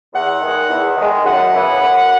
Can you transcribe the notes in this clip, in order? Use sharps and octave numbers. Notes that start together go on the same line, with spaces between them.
E2 F#5
D#3 G#3
E2
D#3 G#3
F#2 F#5
C#3 E3 B3
F#2